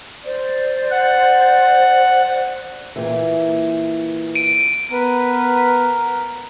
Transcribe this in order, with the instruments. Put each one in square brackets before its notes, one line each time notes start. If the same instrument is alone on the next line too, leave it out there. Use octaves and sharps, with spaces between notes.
[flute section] C5 D5
[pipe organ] F#5
[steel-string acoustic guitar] A#2 E3
[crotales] D7 D#7
[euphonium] B3 [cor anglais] A#4 [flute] B4